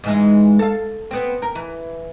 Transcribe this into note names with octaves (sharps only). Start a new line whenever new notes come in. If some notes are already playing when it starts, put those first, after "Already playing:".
G#2 E3 G#3
A4 F5
B3 C4
A#4
E3